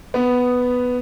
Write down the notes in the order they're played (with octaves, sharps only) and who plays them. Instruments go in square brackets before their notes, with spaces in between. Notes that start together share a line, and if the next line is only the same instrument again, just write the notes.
[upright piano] B3